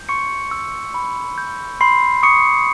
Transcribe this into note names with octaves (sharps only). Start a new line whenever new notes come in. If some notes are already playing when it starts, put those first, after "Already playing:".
Already playing: G6
C6 C#6 C#7
E6
B5
G6
B5 C6 C7
C#6 D#6 C#7